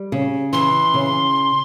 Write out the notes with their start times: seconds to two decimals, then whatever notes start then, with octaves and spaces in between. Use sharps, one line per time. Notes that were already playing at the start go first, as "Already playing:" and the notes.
Already playing: G3
0.12 C#3
0.53 E3 C6
0.94 C#3